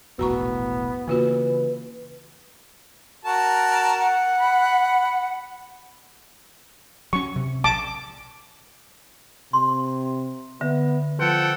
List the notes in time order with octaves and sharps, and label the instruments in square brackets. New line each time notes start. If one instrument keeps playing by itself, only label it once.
[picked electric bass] E1 A#1 A2 [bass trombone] B3 [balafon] F#4 A#5 C#6
[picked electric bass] C#3 E3 [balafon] A#3 F4 F#4 [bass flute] B4
[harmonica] F#4 A#4 A5
[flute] F#5
[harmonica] B5
[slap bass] F#3 C#4 [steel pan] C#6
[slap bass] C3
[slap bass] A#1 [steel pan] A5 D6
[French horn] C3 [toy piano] C6
[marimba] D3 [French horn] B3 [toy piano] E5
[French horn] F3 [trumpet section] A4 F#5 G5 [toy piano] B4